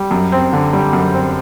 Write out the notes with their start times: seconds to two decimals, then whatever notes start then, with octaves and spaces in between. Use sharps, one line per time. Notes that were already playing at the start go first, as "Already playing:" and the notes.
Already playing: G3
0.11 F#2
0.32 C4
0.53 D3
0.73 G3
0.93 F#2
1.14 C4